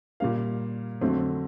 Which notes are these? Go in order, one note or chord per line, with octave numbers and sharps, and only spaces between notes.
A#2 G3 A#3 F5
F2 D3 F#3 A3 C4